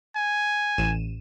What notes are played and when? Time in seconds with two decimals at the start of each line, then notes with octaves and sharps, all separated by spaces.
0.16 G#5
0.78 A1 D#7 E7